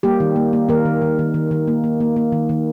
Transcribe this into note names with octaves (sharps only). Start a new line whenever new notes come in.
G3 A#3 G4
D#3
A#3
A#3
D#3 A#3 A#4
D#3
D#3
D#3
D#3
D#3
A#3
A#3
A#3
A#3
D#3
D#3